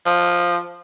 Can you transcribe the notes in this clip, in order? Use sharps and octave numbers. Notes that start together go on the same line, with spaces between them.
F3